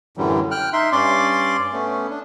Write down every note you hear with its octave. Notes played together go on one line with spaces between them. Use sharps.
F#2 A2 D3 E3 F#3 G3
G5 F6 F#6
D#4 E5 C6
G2 C#4 D5 C6 D6
A3 B3 C#4
D4